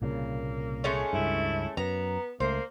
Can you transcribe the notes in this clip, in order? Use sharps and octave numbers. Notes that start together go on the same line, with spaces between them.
C2 A#2 C#3 A#3
G#3 A3 C#4
C#2 G2 E4
F#2 B3 A#5
C#2 A3 A#3 C5